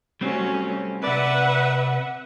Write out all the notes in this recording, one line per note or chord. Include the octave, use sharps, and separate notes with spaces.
F#3 G3 A3 C4 C#4
C3 B4 D5 E5 F#5